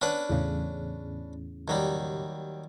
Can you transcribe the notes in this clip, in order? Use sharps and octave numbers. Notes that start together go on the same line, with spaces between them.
B3 C#4 D4 B4
E2 A2 C#3
D#2 F#3 G3